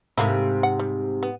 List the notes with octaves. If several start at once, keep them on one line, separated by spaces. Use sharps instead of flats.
G#2 C3 A3 A#3 E4
F#5
G3
B3